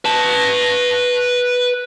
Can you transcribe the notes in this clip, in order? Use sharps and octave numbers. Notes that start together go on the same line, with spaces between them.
B4 A5